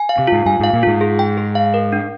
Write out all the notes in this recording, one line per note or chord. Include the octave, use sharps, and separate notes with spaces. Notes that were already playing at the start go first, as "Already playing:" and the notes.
Already playing: G#5
F5
C3
G#2 F4
G2 G#5
G#2 F5
A#2
G#2 F4
G#4
G5
G#4
F5
A#4
D4